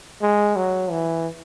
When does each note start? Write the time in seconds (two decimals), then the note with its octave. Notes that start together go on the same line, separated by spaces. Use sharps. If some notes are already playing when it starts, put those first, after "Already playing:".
0.22 G#3
0.56 F#3
0.91 E3